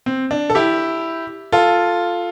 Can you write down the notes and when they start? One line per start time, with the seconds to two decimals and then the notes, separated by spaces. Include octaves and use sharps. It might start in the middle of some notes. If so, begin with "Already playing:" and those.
0.06 C4
0.31 D4
0.50 A4
0.55 E4 G4
1.52 F4 A4